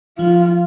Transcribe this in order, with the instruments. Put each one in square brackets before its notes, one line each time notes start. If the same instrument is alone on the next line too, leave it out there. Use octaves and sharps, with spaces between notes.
[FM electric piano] F3 [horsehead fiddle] F4